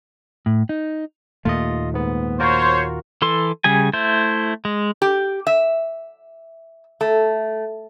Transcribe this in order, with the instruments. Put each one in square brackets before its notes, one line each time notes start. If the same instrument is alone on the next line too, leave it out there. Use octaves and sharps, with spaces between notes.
[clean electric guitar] A2
D#4
[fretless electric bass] D#2 A#2 A3 [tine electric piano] F4 D#5
[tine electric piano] G#2 B3
[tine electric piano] F4 F#4 A#4 [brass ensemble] C5 C#5
[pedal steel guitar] E3 A4 C6
C#3 G3 G#4 G#5
A3 E4 C5
G#3
[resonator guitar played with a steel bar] G4
E5
A3